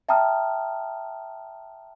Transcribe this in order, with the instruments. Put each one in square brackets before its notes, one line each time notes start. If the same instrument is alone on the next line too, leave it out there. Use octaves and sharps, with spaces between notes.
[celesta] E5 G5 A5 A#5 D#6 F6